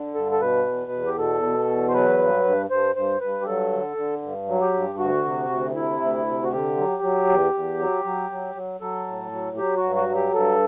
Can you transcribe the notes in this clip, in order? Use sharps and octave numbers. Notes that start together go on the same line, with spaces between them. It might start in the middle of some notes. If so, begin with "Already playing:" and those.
Already playing: D3
G2 A4
A4
B2 B4
E2
E2
G4
B2 A4
B2
E2
C5
F#3 B4
G2
G2
G2 C5
G2 C5
G2 B4
G4
F#3 A4
D3
D3
G2
F#3
G4
G2
D2 F#4
C3
D2
C3 E4
D2
C3
F#4
D3 G4
F#3
F#3
E2
E2
F#3
F#3
F#3
F#3
F#3 A4
A2
F#3
F#3 G4
F#4
G2
F#4
F#3
G4
G2 A4